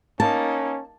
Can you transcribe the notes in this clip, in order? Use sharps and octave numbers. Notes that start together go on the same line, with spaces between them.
A#3 C#4 D#4 A5